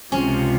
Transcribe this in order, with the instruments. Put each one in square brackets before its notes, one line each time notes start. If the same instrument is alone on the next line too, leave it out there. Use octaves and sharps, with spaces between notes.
[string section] C#2 C3 F3 [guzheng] C#4